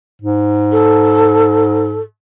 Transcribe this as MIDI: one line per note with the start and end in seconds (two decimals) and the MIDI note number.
0.22 2.03 44
0.71 2.00 69